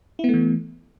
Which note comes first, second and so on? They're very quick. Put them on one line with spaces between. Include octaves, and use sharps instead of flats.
E4 B3 A3 E3